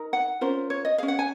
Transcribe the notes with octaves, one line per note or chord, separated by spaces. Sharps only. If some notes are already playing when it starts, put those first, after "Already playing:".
Already playing: D#4 A#4
F#5
C#4 F4 A#4 C5
C#5
D#5
C#4 G#4 F5
F#5
G#5